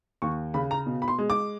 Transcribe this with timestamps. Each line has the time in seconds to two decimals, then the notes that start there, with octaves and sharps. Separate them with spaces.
0.22 D#2 C#6
0.54 C#3 B5
0.71 A#5
0.86 B2
1.02 B5
1.08 C6
1.18 G#3
1.30 D6